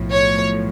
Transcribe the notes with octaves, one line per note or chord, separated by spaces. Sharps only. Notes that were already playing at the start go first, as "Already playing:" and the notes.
Already playing: B1 A2 F3
C#5